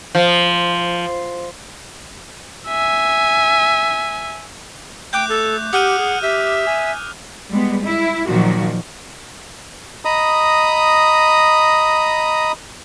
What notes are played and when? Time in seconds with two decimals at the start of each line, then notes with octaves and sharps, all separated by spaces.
0.15 F3
2.68 E5 G#5
5.13 A3 G5 D6 F#6 G6
5.29 A4
5.73 G4 F#5 D#6 F6 D#7
5.99 G#4
6.23 G4 E5
6.67 G#5
7.50 G3 G#3 B3
7.84 E4
8.27 A#2 D#3 F3 F#3 F#4
10.05 D#5 A#5 B5 D#6